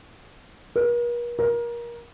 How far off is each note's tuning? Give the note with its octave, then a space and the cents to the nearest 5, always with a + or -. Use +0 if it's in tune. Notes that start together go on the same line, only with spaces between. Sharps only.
A#4 +45
A#4 +25